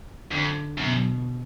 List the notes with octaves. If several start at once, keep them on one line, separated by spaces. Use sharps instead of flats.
F2 D3
F#2 B2